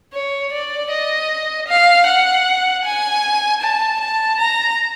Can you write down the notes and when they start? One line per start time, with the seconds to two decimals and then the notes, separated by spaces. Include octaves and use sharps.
0.14 C#5
0.53 D5
0.91 D#5
1.68 F5
2.07 F#5
2.84 G#5
3.62 A5
4.00 A5
4.39 A#5